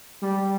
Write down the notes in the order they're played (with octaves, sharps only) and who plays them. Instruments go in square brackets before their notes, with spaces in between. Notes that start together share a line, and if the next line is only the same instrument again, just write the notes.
[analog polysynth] G3